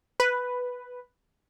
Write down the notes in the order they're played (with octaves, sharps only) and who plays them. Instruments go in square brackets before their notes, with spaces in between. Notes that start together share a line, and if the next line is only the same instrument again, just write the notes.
[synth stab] B4